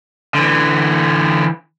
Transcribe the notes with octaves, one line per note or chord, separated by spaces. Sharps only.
D3 E3